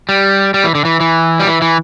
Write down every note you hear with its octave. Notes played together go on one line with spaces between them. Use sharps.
G3
G3
E3
D3
E3
E3
G3
E3
E3